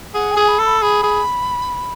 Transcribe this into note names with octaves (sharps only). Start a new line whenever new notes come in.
G#4 F#5
G#5
G#4
B5
A4
B5
G#4 B5
G#4